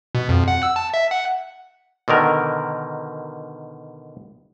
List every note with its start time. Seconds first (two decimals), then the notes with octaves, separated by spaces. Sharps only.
0.15 B2
0.29 F2
0.48 F#5
0.63 E6
0.76 A5
0.94 E5
1.11 F#5
2.08 B2 D3 D#3 A#4